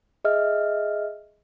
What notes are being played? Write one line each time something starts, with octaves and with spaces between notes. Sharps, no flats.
G#4 D#5 E5 F6